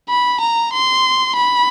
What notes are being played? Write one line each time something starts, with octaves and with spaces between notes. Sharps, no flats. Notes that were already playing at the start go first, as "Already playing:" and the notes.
B5
A#5
C6
B5